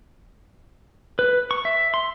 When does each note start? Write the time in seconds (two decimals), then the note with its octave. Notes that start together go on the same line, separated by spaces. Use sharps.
1.19 B4
1.51 C#6
1.65 E5
1.94 C6